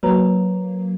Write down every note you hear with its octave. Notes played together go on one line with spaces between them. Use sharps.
F#3 A#3 B4 C#5 A#5